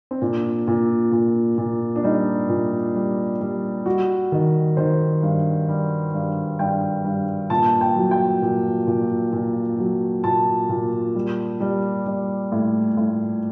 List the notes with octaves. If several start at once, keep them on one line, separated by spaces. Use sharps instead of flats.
C4
A#2 D4
A#2
A#2
A#2
D4
G3 D#4
A#2
G3
G3
G3 F#4
D#3
D#3 C5
G2
G3
G2
G2 G5
G2
A#2 A5
G5
F#3
G5
A#2
A#2
A#2
F#3
A#2 A5
A#2
G3
G3
G3
A2
A2